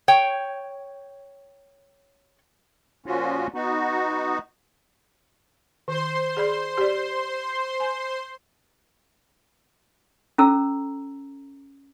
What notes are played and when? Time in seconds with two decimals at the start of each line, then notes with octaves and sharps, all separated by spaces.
0.08 C#5 G5
3.06 A#2 F3 C#4 F4 F#4
3.54 B3 D#4 F#4
5.88 D#3 C5 C6
6.37 G#4 D5 B5
6.78 G4 D5
7.80 G#5
10.38 C#4 A4 A#5 E6